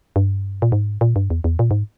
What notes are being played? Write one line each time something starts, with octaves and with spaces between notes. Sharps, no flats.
G2
A#2
G#2
A#2
G2
E2
E2
A#2
G#2